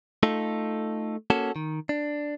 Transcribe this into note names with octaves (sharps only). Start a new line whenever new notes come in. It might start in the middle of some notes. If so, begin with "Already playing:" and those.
A3 D#4 F4 A4
A#3 C#4 F#4 A4
D#3
D4